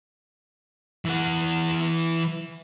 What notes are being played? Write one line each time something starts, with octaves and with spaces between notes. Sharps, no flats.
E3 F#5